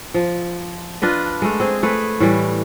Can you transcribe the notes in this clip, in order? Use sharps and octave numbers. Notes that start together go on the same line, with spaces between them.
F3
D4 F4 B4 D#5
G#3 A3
C4 G#4
A3 G#4 B4
A2 E3 G3